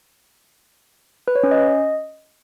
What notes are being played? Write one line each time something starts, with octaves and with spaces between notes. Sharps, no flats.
B4
C#5
C#4
D#5